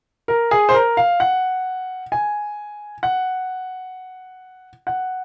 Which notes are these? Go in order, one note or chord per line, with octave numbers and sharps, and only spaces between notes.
A#4
G#4
C5
A#4
F5
F#5
G#5
F#5
F#5